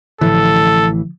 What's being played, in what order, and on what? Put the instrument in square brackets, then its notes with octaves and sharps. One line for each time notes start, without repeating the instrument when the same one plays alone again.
[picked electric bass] A1 A2 E3 [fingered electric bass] D3 F3 A3 [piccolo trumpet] A4